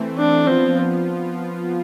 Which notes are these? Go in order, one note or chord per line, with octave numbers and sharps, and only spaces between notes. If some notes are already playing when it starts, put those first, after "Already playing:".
Already playing: E3 A3 C4
D4
F3 B3 C4 F4